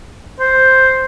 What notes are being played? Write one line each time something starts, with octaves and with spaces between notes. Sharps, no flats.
C5